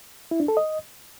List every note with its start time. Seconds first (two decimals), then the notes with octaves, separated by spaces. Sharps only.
0.31 E4
0.40 D4
0.48 A4
0.57 D#5